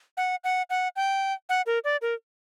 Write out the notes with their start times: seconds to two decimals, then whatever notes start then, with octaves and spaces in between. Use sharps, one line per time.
0.17 F#5
0.44 F#5
0.70 F#5
0.96 G5
1.49 F#5
1.66 A#4
1.84 D5
2.02 A#4